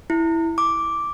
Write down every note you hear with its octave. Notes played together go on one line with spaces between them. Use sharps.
E4
D6